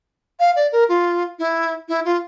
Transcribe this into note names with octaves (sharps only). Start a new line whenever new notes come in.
F5
D5
A#4
F4
E4
E4
F4